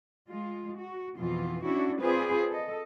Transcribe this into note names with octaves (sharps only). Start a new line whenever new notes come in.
G#3 F4
F#4
F2 B2 E3 F4
C#4 D4 E4 F#4
C4 F4 G#4 B4 C5 D5
A4 D#5